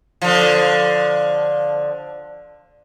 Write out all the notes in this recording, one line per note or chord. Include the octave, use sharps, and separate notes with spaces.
D3 F3